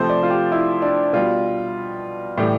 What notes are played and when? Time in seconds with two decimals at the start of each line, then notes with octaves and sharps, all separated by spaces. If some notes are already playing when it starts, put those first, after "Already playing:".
Already playing: C3 F3 A3 C5
0.09 D5
0.23 F4
0.30 G4
0.52 E4
0.82 D4
1.13 B2 G3 F4
2.38 A2 E3 G3 G4